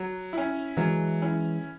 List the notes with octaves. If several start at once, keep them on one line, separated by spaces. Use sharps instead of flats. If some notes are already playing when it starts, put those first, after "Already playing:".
Already playing: F#3
C#4 E4
E3 F#3 G#3
C#4 E4